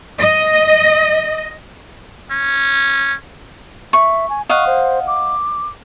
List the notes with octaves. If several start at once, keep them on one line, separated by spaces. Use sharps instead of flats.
D#5
C#4
E5 C#6
G#5
D#5 F5 F#5 C#6
C5
D6